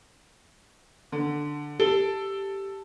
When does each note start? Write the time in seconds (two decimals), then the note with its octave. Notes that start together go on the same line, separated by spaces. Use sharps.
1.12 D3
1.80 G4 A4